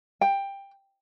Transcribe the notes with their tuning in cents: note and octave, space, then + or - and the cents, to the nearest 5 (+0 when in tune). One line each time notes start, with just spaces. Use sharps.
G5 +15